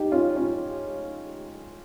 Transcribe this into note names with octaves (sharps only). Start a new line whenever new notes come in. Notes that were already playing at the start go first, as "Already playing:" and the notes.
Already playing: D#4 G4
C#4 F4
C#4 F4